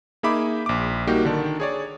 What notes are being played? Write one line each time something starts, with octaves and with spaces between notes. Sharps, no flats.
A#3 D#4 G#4 E5 B5 D6
A#1 D6
G3 A#3 D#4 F#4 G4
D3 D#3 D4
G#4 C#5 D5